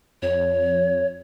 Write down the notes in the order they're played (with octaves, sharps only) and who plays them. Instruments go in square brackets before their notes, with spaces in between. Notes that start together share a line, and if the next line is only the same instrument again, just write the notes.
[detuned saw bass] F2 [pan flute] C#5